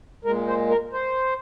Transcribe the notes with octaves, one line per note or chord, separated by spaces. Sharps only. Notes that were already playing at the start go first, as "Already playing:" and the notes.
A#2 G#3 A#4
C5
A#4
C5